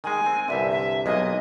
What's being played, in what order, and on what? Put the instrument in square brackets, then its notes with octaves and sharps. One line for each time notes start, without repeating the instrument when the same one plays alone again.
[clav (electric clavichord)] D#3 G#3 [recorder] G#5
[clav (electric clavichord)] C4
[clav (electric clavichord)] C2 G2 D3 [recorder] E5
[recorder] E5
[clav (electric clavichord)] B1 G#3 A#3 [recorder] D#5